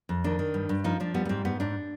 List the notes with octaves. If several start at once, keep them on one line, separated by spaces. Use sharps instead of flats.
F2
D#3 D4
D#3
G2
G2
F3 D#4
F3 D4
G3 B3
B3
G#2 C4
G#2 B3
G#2 D4